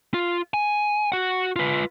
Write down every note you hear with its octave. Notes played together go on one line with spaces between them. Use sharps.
F4
G#5
F#4 F#5
F4 B4